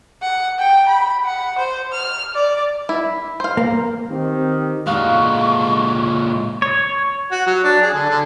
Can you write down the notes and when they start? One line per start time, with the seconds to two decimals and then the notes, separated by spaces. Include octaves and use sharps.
0.22 F#5
0.59 G5
0.89 B5
1.25 F#5
1.58 C5
1.92 F6
2.35 D5
2.89 E4
3.40 C5 F5
3.57 A#3
4.10 D#3 C4 G4
4.87 A#2 G#3 F5 F#5 C#6
6.62 C#5
7.31 F#4
7.47 F#3
7.64 D4
7.82 G#4
7.94 D3
8.09 D3